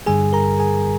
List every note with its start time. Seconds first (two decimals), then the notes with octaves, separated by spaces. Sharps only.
0.06 G2 D3 G3 G#4 G#5
0.33 A#4 A#5
0.59 G#4 G#5